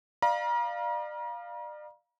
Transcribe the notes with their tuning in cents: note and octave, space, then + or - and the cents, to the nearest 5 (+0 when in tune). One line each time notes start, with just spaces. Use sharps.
D5 +40 F5 +0 A#5 +40